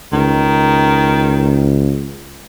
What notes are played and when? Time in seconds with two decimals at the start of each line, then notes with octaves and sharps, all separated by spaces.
0.13 C#2 D#3